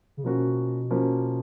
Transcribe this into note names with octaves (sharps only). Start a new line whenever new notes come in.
C#3
B2 F3 A#3 C#4 F#4
F3 A#3 C#4 F#4